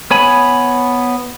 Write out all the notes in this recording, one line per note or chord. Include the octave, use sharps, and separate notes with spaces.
B3 C#5 G#5 B5